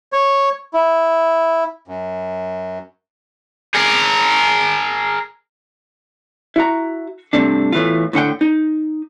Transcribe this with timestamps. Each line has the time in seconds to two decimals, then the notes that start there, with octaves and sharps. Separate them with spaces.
0.13 C#5
0.73 E4
1.88 F#2
3.75 G#4 A#4
6.56 E4 F#4 A#5
7.33 G2 C3 A3 D4
7.72 E2 A2 E3 A3 F4
8.13 A2 D3 F#5 G5
8.41 D#4